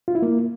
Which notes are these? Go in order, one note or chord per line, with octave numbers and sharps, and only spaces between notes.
F4
E4
A#3